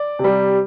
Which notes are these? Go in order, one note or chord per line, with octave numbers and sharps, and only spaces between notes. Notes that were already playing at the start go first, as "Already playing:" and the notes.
Already playing: D5
C3 G3